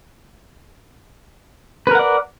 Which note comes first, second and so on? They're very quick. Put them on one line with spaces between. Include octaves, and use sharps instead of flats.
B4 A#4 F#5 D5